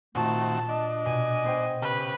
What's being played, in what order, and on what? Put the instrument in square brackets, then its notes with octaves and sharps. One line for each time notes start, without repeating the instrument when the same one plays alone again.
[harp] A#2 C#6 [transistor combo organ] D#3 C4 F#4 [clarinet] A3 [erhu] A5
[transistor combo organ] D4 [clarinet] D#5
[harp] B2 [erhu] G#5
[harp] B3 C5 G5
[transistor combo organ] C#3 G4 [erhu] B4